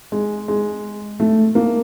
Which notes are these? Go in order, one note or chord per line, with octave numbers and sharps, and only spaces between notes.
G#3
G#3
A3
A#3